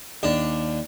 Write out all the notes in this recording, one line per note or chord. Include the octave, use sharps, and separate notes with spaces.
D#2 D4